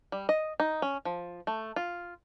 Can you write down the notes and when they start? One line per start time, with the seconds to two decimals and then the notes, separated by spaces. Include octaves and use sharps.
0.12 G3
0.29 D#5
0.60 D#4
0.82 C#4
1.05 F3
1.47 A3
1.76 F4